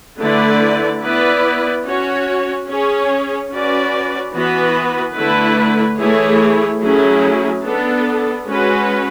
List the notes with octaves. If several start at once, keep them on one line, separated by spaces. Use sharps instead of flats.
D3 A3 E4 B4 D5
B3 E4 B4 D5
C#4 F#4 C#5
C#4 G#4 C#5
C#4 F#4 B4 D5
E3 B3 F#4 B4
D3 A3 E4 B4
E3 A3 E4 G#4 C#5
F#3 A3 C#4 E4 G#4
B3 D4 A4
G#3 C#4 F#4 B4